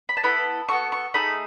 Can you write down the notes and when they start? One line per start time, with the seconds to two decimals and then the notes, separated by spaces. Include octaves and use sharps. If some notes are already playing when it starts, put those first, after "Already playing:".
0.09 B5
0.17 A5
0.23 B3 E4 A4 B5
0.69 B3 F#4 A4 C#6
0.92 C#6
1.14 A3 D#4 G#4 B5